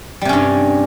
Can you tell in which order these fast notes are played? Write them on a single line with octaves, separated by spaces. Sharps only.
G3 C3 C#4 G2